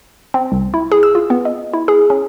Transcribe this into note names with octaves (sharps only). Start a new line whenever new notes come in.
C4
C2
E4
G#4
E6
F4
B3
D#5
E4
G#4
C#4